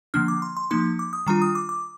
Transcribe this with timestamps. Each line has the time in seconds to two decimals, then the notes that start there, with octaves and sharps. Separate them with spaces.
0.14 D3 F3 A#3 D4 F6
0.28 D6
0.42 C6
0.57 C6
0.71 F3 A#3 D#4 C6
0.99 D6
1.13 D#6
1.27 D#3 G3 D4 F4 A#5
1.42 D#6
1.55 D6
1.69 D6